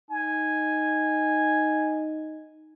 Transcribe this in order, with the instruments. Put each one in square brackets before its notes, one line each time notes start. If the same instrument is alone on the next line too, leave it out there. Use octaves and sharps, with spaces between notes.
[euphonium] D#4 [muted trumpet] G#5